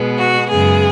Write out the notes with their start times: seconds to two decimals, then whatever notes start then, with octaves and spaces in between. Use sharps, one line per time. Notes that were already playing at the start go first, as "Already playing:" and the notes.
Already playing: B2 G#3 B3
0.18 F#4
0.49 F#2 C#3 G#3 B3 G#4